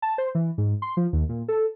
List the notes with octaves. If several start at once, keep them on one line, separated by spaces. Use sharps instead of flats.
A5
C5
E3
G#2
C6
F3
D#2
A#2
A4